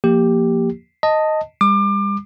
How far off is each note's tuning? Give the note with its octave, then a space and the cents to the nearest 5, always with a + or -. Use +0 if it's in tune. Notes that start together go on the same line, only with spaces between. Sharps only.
F3 +0 A#3 +0 G4 +0
D#5 +0 A5 +15
G3 +40 D6 +30